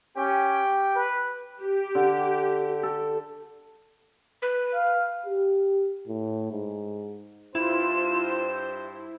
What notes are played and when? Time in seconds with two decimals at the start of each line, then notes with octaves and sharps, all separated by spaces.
0.16 C#4 G4 G5
0.95 B4
1.61 G4
1.95 D3
2.83 A4
4.42 B4
4.74 F5
5.26 G4
6.08 A2
6.52 G#2
7.55 G2 E4 F4 C5 E7